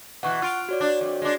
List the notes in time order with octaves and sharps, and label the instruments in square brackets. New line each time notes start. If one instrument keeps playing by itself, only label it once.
[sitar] B2 E3 [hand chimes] F#5 C#6 F#6
[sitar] F4 [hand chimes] F6 D7
[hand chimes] F#4 C#5 D5
[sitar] D4
F2
G#3 D4